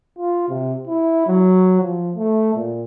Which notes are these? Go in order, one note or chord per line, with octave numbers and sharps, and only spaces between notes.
F4
C3
E4
F#3
F3
A3
A#2